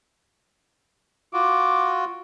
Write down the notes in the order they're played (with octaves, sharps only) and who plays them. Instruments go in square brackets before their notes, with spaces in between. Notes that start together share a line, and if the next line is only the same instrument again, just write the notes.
[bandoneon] F4 F#4 [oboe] D6